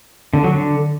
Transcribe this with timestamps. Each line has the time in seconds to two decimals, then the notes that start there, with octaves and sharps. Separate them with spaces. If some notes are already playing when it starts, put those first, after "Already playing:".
0.34 D3
0.44 F#3
0.54 D3